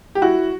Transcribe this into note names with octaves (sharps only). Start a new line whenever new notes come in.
G4
E4 F#4